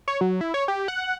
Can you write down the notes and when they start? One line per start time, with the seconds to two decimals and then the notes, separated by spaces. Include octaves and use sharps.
0.08 C#5
0.21 F#3
0.41 E4
0.54 C#5
0.68 G4
0.88 F#5